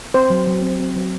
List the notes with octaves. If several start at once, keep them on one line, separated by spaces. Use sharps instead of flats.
C4 C5
F#3
F#3
C4
C4
F#3